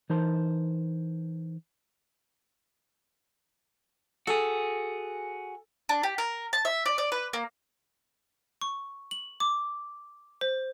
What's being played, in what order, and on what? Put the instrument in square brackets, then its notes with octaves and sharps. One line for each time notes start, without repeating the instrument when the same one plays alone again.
[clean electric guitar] E3 D#4 A#4 C5 A5 C6
[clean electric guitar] F#4 G#4 [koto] A4
[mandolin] D4
G4
A#4
A5
E5
D5
D5
B4
A#3
[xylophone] C#6
F#7
D6
C5